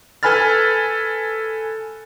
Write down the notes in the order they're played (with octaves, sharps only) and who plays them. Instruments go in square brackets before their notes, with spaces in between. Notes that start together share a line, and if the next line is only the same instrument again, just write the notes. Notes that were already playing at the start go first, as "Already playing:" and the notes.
[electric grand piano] A4 B4 G#5 B5 F6 A6